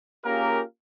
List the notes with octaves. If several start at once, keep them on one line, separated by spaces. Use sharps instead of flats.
A#3 C#4 F4 G4 G#4 A#4